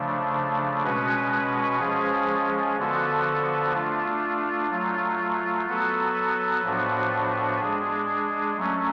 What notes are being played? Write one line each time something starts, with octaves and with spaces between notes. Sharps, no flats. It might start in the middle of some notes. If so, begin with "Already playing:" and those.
Already playing: C#3 F3 A3 D4
B2 G#3 C#4 F#4 B4
F3 G#3 C#4 G#4
D3 F3 B3 F#4 A4
A3 D4 F4
F#3 A3 F4
F#3 B3 F#4 A4
A2 F3 B3 D4 F#4
G#3 D4 G#4
F#3 A3 C#4